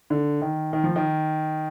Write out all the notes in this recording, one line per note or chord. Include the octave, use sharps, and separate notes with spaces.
D3
D#3
D#3
F3
D#3